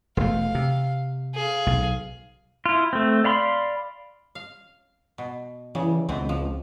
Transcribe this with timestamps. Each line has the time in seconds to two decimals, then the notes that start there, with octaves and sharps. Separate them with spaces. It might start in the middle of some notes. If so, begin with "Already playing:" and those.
0.17 E1 A3 F5
0.55 C3
1.35 G#4 F5
1.66 B1
2.66 E4 F4
2.93 A3 C4
3.24 D5 F5 B5 C6
4.35 F5
5.18 B2
5.75 C#3 E3 G3
6.09 C#2 B2 E3 C4
6.29 F3